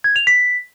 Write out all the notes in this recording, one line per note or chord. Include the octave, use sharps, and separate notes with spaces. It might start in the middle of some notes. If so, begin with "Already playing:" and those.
G#6
F7
B6